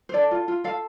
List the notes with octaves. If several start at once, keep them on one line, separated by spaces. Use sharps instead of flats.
C5
A4 D5
F4
F4
A4 F5